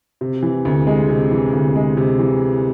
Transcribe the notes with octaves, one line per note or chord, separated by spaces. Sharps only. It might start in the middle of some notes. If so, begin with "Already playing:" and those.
C3
E3
D2
G#3
C3
E3
D2
G#3
C3
E3